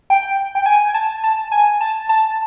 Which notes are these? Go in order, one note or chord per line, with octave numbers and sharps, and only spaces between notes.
G5
G5
G#5
G#5
A5
A5
G#5
A5
A5